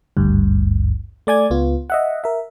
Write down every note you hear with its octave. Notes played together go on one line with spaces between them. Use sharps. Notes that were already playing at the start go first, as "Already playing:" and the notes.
G#1 D2 G2
A3 D5 G#5 G#6
C#2 B3 F4
D#5 E5 F#5
A#4 E5